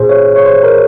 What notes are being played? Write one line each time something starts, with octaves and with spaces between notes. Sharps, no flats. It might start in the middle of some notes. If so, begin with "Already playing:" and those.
Already playing: A#2 G#4 C5
C#5
C#5
C5
A#4